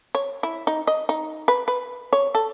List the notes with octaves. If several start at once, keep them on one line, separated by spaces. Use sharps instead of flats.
C#5
E4
D#4
D#5
D#4
B4
B4
C#5
A4